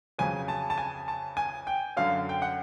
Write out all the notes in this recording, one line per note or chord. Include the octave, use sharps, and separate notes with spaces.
F2 C#3 F#3 G#5
A5
A5
G#5
A5
G#5
G5
F#2 D3 F#3 F5
G5
F#5